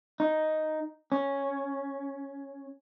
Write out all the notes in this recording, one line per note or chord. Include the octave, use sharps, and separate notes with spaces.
D#4
C#4